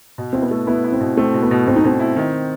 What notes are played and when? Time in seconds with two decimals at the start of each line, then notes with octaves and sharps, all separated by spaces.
0.18 B2
0.33 C4 E4
0.42 B3
0.51 A3
0.67 B3 E4
0.84 E4
0.92 C4
1.01 B2
1.17 A3 C4
1.34 B2
1.42 B3
1.51 B2
1.67 B2 C4
1.76 D#4
1.84 B2 C4
2.00 E4
2.16 D#3